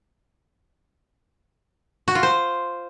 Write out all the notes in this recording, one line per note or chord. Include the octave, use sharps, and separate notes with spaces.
F#4
F4
C5